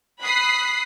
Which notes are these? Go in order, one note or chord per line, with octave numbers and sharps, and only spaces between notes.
B5 D#6 F#6 B6 C7